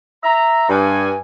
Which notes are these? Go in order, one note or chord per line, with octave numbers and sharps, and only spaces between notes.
E5 A#5
G2 G#5